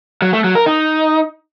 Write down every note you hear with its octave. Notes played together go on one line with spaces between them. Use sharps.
F#3
A3
F#3
A#4
D#4